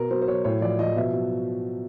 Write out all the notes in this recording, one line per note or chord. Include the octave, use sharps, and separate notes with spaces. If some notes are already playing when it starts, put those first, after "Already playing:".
Already playing: B2 A#4
F#3 C5
C5
F#3 C#5
A2 C#5
F3 D5
F3 D#5
B2 E5
F#3